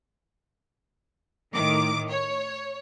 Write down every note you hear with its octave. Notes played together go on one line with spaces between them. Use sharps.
A2 D#3 D6
C#5